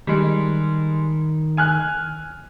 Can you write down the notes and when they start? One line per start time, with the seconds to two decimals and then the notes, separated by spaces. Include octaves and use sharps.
0.07 D#3 G3 G#3
1.57 G#5 F6 F#6